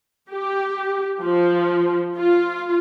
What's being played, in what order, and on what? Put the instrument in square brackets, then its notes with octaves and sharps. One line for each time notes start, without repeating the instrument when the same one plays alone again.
[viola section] G4
F3
F4